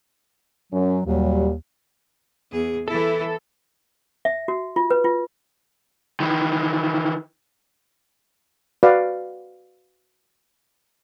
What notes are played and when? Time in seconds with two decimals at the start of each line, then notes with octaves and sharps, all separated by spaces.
0.73 F#2 F#3 C#4
1.06 D#2 A#2 F#3 G3
2.52 E2 G#4
2.88 E3 E4 A4
4.25 E5
4.48 F#4
4.76 F4
4.90 B4
5.04 F4
6.20 D#3 E3
8.83 F#4 B4 D5 F5